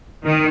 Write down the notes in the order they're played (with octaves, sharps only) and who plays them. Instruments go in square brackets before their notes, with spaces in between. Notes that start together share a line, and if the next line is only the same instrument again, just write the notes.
[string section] D#3